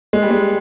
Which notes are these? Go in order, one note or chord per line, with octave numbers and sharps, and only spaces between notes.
G#3
G3
G#3